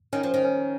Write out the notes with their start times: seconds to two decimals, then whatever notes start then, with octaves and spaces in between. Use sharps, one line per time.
0.13 D#3 C#4
0.23 F3
0.34 D#3
0.45 C#4